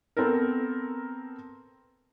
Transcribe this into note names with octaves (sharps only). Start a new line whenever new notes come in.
B3 C4 A4 A#4